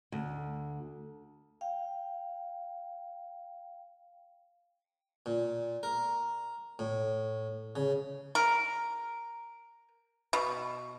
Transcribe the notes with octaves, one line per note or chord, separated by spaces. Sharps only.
D2
F5 G5
A#2
A#4
A2
C#3
A#4
B2